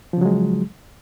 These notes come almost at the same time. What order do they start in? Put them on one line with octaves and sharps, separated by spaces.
F3 C#3 F#3 G#3